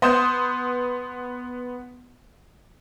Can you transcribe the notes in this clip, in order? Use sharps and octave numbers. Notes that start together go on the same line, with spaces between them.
B3 C6 D#6 G6 E7